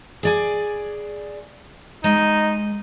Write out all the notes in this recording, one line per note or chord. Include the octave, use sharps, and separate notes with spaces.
G#4 D5 G#5
G#3 D#4